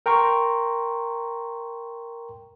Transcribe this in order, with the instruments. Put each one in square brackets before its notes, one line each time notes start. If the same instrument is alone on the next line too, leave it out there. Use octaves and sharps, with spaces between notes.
[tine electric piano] A#4 G5 A#5 C6 C#6